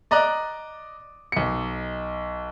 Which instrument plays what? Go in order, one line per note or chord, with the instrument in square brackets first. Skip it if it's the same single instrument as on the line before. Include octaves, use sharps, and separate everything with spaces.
[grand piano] D5 D#5 A#5 D6 F#6
B1 C#7